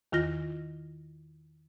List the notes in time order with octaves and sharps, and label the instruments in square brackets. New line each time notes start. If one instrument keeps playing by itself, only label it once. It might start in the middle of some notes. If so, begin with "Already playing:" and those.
[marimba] E2 D#3 F4 A#6